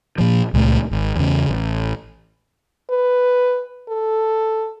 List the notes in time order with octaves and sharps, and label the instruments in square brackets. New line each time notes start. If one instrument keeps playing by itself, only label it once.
[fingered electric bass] A#2 F3
C#2 A#2 G#3 A3
G#1
E2 C#3
A1
[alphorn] B4
A4